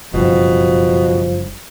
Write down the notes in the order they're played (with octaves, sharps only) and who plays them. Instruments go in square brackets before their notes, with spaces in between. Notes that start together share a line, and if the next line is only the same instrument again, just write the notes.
[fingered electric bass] F#1 G2 [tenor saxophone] B2 [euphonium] F3